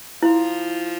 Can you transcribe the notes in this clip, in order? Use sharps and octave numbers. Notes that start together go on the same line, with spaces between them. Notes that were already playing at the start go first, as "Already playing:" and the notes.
F3 E4 F4